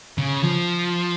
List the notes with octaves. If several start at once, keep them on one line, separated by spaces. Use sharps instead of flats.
C#3
F3